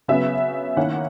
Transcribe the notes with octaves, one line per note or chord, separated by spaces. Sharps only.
C#3 F#3 B3 E5
D#3 A#3 C#4 E4 F#5